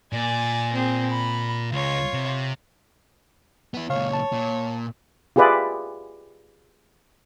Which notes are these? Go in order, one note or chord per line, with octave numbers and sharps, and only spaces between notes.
A#2 D5 G#5
C4 G#4
B5
C#2 F4 C#5
C3
B3 E4
C#2 A#2 C#5 F5
A5
A#2
F4 G4 G#4 B4 D5 E5